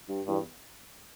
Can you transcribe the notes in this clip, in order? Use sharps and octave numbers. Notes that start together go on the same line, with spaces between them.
G2
E2 G2